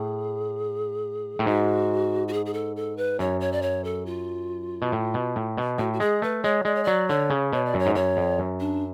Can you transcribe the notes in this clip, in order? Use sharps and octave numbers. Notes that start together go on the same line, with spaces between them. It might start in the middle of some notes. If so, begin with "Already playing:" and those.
Already playing: A2 G#4
A2
G#2 F#4
F#4
G#4
G#4
A4
A4
B4
F#2 C#5
C#5
D5
C#5
A4
F4
B2
A2
B2
A2
B2
A2 F#4
F#4
G#3 G#4
A3 B4
G#3 C#5
G#3 D5
C#5
F#3 D5
D3 C#5
C#3
B2 C#5
D5
F#2
C#5
G#2
F#2 C#5
F2
F#2
D4